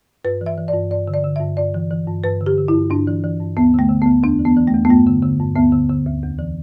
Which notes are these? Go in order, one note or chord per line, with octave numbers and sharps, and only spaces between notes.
G2 B4
E3
E5
E3
D5
G2
G2 D5
D3
D5
D3
G2 E5
G2 D5
E3
E3
G2
G2 B4
D3
G4
D3
E4
G2
G2 D4
E3
E3
G2
D2 B3
D3 A3
D3
B3
D2
E2 D4
E3
B3
E3
A3
E2
B3
G2 A3
D3
D3
G2
D2 B3
D3
D3
D2
E2
E3